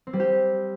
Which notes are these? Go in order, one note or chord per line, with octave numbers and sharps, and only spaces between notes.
C4
G3
G4